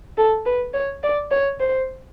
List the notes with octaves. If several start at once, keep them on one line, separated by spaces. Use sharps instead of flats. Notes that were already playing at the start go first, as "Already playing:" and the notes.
A4
B4
C#5
D5
C#5
C5